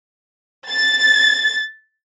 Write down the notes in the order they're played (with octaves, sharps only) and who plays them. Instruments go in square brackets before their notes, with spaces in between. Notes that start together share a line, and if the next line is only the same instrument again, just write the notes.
[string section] A6